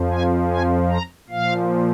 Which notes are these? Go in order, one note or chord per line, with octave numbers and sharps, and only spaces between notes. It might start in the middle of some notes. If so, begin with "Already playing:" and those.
Already playing: F2 F3
G#5
G#5
A#5
A#2 F3 F5